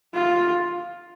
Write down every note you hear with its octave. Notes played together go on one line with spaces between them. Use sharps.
F4